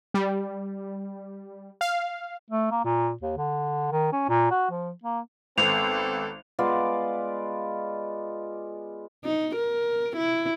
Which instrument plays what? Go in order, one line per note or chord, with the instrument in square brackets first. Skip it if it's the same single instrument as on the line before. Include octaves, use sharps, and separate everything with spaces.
[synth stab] G3
F5
[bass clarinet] A3
A#3
A#2
D#2
D3
D#3
C#4
A#2
F#4
F3
A#3
[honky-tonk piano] G#1 [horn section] B3 C4 A4 [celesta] F7
[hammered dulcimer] G#3 B3 F4 D5
[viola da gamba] D#4
A#4
E4